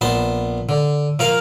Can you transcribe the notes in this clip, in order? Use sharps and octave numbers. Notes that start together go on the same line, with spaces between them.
A#1 B3 A5 C6
D3
F3 A#4 F5